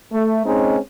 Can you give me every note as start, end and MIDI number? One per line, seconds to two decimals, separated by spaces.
0.11 0.43 57
0.46 0.77 56
0.46 0.77 60
0.46 0.77 61
0.46 0.77 63